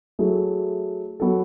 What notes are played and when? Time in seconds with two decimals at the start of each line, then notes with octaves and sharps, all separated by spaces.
0.19 F#3 A3 E4 G#4
1.20 F#3 B3 F#4 A4